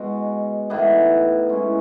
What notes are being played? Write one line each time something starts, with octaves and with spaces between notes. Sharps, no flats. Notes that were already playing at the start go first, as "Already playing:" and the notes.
Already playing: B2 G#3 B3 F#4
A2 E3 B3 D#4
G#3 C#4 E4